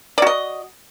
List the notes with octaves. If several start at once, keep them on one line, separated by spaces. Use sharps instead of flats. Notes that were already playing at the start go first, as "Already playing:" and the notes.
F#4 D5 D#5